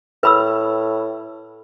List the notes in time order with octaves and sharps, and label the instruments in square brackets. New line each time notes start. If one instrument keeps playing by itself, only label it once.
[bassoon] A2 [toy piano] B4 B5 E6